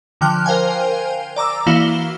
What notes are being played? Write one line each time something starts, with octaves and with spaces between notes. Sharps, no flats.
D3 F3 G5 F6 F#6
A#4 C5 F5 G5 G#5
D5 A#5 D6 E6
E3 A#3 E4 F#4 F5 G7